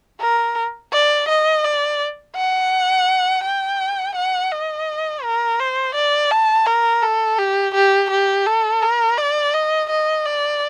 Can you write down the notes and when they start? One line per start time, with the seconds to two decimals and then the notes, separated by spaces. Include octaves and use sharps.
0.21 A#4
0.93 D5
1.29 D#5
1.64 D5
2.36 F#5
3.44 G5
4.15 F#5
4.52 D#5
5.23 A#4
5.59 C5
5.95 D5
6.31 A5
6.66 A#4
7.02 A4
7.39 G4
7.75 G4
8.10 G4
8.46 A4
8.82 A#4
9.18 D5
9.54 D#5
9.90 D#5
10.26 D5